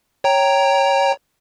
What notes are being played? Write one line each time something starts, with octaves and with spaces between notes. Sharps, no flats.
C#5 G5 A#5